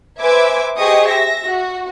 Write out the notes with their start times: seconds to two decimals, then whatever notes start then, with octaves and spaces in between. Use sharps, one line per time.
0.20 B4 C5 E5 G#5 D6 G#6
0.78 G4 G#4 C5 D#5 C#6 D#6
1.08 E5 A#6
1.46 F#4